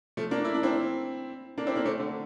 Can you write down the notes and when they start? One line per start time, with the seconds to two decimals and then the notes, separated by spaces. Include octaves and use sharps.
0.17 F3 A3
0.31 A#3 D4
0.45 E4
0.54 D4
0.63 C4 E4
1.58 A#3 D4
1.67 C4 E4
1.76 A#3 D4
1.85 A3 C4
2.00 D3